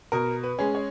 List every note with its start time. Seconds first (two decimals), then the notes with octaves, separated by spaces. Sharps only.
0.12 B2 A#4
0.43 B4
0.59 G#3 C#4
0.75 C#5